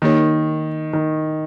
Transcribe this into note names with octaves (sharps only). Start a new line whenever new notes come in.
D#3 A#3 D#4 G4 A#4 C#5
D#3